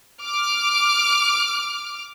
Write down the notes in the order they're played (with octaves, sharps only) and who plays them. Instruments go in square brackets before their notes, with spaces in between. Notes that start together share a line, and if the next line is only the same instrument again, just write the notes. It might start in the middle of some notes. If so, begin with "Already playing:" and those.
[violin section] D6 F6